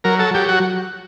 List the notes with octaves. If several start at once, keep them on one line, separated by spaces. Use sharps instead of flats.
F#3 A#4
A4
F#3 G4
F#4